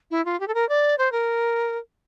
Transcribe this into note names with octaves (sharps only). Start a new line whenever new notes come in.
E4
F4
G4
A4
A#4
D5
C5
A#4